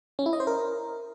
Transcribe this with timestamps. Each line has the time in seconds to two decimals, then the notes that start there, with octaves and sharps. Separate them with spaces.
0.19 C#4
0.26 E4
0.33 D#5
0.40 C5
0.47 A#4